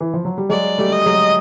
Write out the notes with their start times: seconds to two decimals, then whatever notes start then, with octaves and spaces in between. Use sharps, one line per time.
0.00 E3
0.14 F3
0.25 F#3
0.38 G3
0.49 F#3 G#3 D5
0.78 G3 A3
0.92 D#5
1.06 F#3 G#3